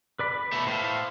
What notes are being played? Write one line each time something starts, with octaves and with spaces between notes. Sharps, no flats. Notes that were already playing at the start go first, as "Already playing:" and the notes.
B4 D5 B5
B4
B2 A3
A2 C5 F5